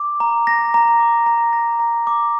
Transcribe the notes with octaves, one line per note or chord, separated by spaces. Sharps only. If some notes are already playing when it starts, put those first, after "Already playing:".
Already playing: D6
A#5
A#6
A#5
D6
A#5
A#6
A#5
D6